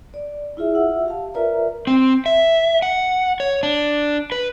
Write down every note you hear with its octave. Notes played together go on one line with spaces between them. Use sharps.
D5
E4 F4 G#4 E5
F4 E5 F#5 E6
G4 F5 A5
F4 A#4 B4 D5 E5 A#5
C4
E5
F#5
C#5
D4
B4